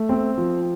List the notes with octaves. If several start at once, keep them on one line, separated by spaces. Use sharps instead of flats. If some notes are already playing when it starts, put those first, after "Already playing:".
Already playing: A3
C4
F3